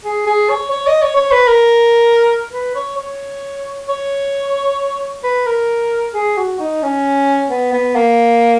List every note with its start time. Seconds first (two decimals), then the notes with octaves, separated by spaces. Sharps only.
0.04 G#4
0.26 G#4
0.49 C#5
0.71 C#5
0.87 D#5
1.02 C#5
1.16 C#5
1.31 B4
1.47 A#4
2.52 B4
2.75 C#5
2.97 C#5
3.88 C#5
5.24 B4
5.46 A#4
6.14 G#4
6.37 F#4
6.59 D#4
6.83 C#4
7.50 B3
7.73 B3
7.95 A#3